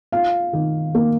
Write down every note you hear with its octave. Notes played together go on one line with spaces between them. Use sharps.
F4 F5
D#3
A#3